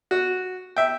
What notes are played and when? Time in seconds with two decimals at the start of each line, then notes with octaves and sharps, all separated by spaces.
0.11 F#4
0.77 E5 G5